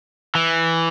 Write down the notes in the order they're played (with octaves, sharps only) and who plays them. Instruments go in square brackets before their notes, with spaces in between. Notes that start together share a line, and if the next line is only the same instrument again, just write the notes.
[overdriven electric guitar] E3